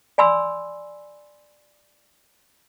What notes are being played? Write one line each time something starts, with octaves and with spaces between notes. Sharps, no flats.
D5 G#5 B5 C6 E6